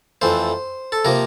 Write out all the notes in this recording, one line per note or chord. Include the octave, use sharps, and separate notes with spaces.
F2 E3 A3 C5
A4
C3 F3 A#3 A#4